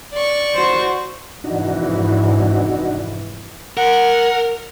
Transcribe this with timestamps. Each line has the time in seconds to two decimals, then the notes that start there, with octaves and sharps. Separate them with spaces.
0.13 D5 C#6
0.55 F#4 C5
1.44 F1 G#2 E3 D4 D#4 F#4
3.77 A#4 F#5